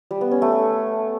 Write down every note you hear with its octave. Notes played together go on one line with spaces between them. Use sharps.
G3
B3
C#4
A3